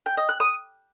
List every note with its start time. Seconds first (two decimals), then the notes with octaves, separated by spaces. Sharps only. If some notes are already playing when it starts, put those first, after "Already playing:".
0.06 G5
0.17 D#5
0.29 F#6
0.40 D#6